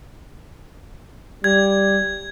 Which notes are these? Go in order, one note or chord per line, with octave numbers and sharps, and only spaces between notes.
G3 G#6